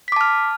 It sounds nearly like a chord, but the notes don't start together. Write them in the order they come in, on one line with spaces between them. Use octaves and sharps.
B6 D6 A5 F6